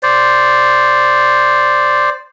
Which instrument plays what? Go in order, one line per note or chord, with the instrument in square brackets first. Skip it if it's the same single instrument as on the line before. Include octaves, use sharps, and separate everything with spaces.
[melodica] C5 D5